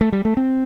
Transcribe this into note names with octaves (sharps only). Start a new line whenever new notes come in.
A3
G3
A3
C4